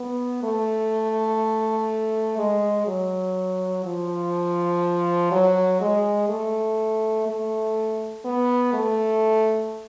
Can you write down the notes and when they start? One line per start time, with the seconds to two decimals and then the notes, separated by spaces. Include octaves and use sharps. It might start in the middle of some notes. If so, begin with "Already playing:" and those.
Already playing: B3
0.43 A3
2.38 G#3
2.87 F#3
3.84 F3
5.31 F#3
5.81 G#3
6.29 A3
7.27 A3
8.25 B3
8.73 A3